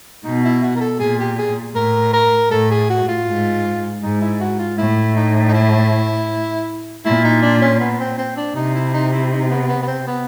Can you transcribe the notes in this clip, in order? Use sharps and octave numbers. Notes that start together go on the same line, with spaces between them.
B2 D#4
E4
F#4
A#4
A4
A#2 G#4
G4
G#4
A2 A#4
A#4
A2 A4
G#4
F#4
F4
G#2
G#2 D#4
E4
F#4
F4
A2 E4
D#4
D#4
E4
A#2 E4
D#4
D4
C#4
B3
C4
C4
D4
C3 D#4
E4
D#4
E4
D#4
B3
B3
B3
C4
B3